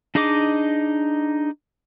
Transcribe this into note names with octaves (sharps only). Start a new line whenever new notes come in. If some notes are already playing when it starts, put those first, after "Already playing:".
D4 D#4 G#4 D#5 D6